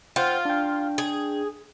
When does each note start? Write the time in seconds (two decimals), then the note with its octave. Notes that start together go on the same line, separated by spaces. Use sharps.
0.16 F4 C5 F#5 G5
0.45 D4 G5
0.98 G#4